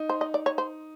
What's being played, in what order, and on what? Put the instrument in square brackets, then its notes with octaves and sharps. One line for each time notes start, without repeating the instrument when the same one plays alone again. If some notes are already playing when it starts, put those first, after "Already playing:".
Already playing: [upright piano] D#4
[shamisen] C5
D#5
D5
C#5
C5